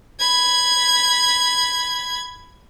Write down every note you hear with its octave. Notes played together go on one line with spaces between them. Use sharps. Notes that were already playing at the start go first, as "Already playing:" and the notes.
B5 G#6